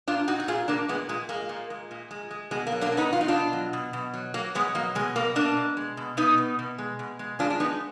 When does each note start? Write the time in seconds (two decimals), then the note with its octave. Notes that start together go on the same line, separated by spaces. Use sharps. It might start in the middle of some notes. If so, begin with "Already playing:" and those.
0.08 A#2 D4 F4
0.28 A#2 D#4 F#4
0.40 F#4
0.48 A#2 F4 G#4
0.68 A#2 A#3 D4
0.89 A#2 G#3 B3
1.09 A#2 G#3
1.29 G#3 A#3
1.49 A#2
1.70 G#3
1.91 A#2
2.11 G#3
2.31 G#3
2.51 B2 G#3
2.67 A#3
2.72 F#3
2.81 A#3 D4
2.92 B2
2.97 B3 D#4
3.13 B2 F4
3.21 D#4
3.28 B2 D4 F4
3.53 F#3
3.73 B2
3.93 B2
4.14 F#3
4.34 F#3 A#3
4.55 B2 G#3 B3
4.75 F#3 A#3
4.95 B2 G#3
5.16 B2 A#3
5.35 B2 A#3 D4
5.57 B2
5.77 G#3
5.97 B2
6.17 B2 B3 D#4
6.38 B2
6.59 B2
6.78 G#3
6.99 B2
7.19 G#3
7.39 G#3 D4 F4
7.50 D4
7.60 G#3 B3 D#4